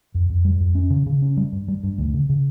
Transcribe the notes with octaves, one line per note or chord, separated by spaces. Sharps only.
F2
F2
G3
F2
C#4
C#3
C#3
C#4
G3
G2
G3
G2
D2
C#3
C#3